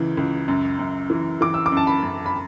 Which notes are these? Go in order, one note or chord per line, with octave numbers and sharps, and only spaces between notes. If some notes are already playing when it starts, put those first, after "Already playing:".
Already playing: C#2 C#3 E3
C#2
F#2
F#2
E3
E3 D6
E6
D6
F#2 A5
B5
F#2
B5